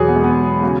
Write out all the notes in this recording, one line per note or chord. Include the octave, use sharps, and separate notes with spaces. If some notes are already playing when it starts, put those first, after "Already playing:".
Already playing: E2 B2 F#3 G#4 C#5
B3
G#3
B3
C#3 F#3 F#4